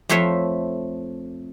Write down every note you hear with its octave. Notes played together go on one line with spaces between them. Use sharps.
F2 A3 C5 C#5 E5